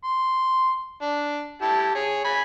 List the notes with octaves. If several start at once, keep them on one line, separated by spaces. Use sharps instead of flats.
C6
D4
E4 G4 A5
G#4 C#5
G#4 G#5 B5